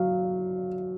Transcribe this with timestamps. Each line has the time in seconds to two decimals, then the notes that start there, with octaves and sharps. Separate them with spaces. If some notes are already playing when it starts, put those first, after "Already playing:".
Already playing: F#3 F5